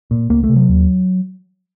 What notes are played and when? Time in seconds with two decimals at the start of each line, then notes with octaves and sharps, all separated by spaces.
0.11 A#2
0.30 C#2 A#3
0.44 A3
0.49 C3
0.56 F#3
0.69 D#2